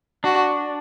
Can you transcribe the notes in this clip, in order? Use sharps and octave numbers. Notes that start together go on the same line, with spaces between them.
D4 F#4